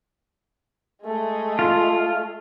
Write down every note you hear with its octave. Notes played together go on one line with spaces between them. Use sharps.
G#3 A3
F4